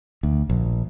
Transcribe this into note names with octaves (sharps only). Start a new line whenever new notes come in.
D2
A#1